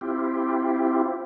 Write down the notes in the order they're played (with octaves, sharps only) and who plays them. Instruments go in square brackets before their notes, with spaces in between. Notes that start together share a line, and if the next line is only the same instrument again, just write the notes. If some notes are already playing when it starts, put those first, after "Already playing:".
[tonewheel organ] C4 E4 F4 G4